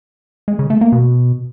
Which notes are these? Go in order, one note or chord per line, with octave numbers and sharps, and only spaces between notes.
G#3
C#3
A3
A#3
B2